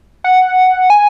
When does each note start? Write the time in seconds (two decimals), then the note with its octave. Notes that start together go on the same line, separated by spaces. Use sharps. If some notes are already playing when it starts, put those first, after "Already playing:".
0.24 F#5
0.90 G#5